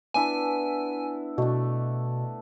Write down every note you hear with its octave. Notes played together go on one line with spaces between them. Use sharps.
B3 D4 E4 G#5
B2 A3 D4